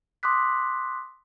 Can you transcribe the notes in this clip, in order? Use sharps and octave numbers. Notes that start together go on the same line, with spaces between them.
C6 D6 D#6 F#6 B6